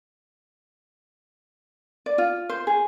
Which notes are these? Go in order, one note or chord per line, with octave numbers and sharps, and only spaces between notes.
D5
F4
C5
G#4